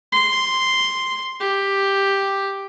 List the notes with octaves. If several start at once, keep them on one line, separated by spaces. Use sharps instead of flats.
C6
G4